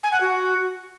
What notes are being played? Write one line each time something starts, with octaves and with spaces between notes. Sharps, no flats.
G#5
F#5
F#4